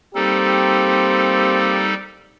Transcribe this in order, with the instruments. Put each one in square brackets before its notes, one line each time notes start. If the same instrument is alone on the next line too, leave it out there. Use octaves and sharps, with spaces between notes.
[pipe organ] G3 D#4 A4 [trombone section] A#3 C4 G4